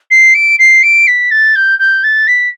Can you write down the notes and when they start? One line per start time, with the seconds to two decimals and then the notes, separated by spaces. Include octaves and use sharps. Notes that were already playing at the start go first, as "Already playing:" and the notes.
0.11 C7
0.34 D7
0.59 C7
0.83 D7
1.07 B6
1.31 A6
1.56 G6
1.79 G6
2.04 A6
2.27 B6